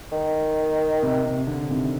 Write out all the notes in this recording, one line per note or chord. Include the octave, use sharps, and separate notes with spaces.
D#3
C3
C3
D3
C3 D#3